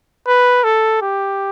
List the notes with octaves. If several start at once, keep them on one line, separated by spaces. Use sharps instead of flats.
B4
A4
G4